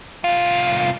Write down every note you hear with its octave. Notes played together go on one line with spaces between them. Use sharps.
C2 F4